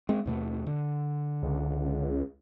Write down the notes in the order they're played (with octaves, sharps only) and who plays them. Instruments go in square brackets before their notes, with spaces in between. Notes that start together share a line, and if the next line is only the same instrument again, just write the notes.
[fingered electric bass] G#3 C4
D#2 B2 A3
D3
[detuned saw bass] C#2